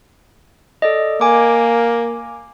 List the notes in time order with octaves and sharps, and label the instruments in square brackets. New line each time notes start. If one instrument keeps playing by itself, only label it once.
[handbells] A4 D5 D#5
[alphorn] A#3 [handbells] G#5 D6